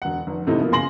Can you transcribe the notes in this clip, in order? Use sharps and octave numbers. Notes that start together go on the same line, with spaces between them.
E1 F#5
F1
G#2 C3 E3 A3 D#4 E4
B2 F3 A#3
C#3 G#5 C6 A#6 F#7